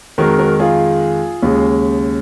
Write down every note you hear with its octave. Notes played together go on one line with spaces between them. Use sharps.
F2 D#3 G#3 F#4 A#4
F#4 A#4
F4 G#4
D#2 C#3 G#3